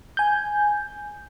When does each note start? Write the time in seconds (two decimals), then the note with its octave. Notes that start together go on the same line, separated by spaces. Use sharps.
0.17 G#5 G6